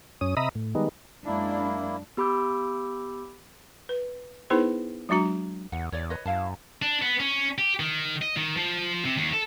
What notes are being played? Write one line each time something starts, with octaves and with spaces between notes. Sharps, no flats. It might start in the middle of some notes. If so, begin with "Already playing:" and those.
F#2 C#4 D#6
C3 D#5 E5 A#5 B5 D#6
A2
D#3 G3 G#3 B3 D#4
F#2 G#3 A#3 D4 E4
B3 G4 B5 D6 E6 G6
B4
B3 D#4 E4 G#4 B4 C5
F#3 G#3 D4 F#4 A#5
E2 F#5
E2 C#5 D5
B4 C#5 D#5
F#2 E4 F5 A5
D4
B3
C#4
G4
D#3
D#5
D#3
F3
C3
D#2
A4